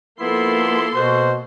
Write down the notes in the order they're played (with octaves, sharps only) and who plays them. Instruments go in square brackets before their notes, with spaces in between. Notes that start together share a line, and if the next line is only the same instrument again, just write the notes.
[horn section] F3 B3 E4 [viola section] A#3 A4 C6
[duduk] B2 [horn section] F#4 [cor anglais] C5